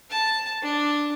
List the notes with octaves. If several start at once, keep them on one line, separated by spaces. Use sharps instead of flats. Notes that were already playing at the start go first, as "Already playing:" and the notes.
A5
D4